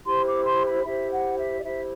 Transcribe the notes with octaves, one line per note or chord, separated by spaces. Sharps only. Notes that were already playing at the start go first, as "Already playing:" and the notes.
E4 G4 C5 C6
D6
C6
B5
E4 G4 C5 E5
F#5
E5
D5
E4 G4 C5 E5